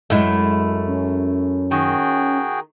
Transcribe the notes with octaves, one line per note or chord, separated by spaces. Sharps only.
F#2 G#3 A3 E4
C#4
D#3 F#4 G#4 G5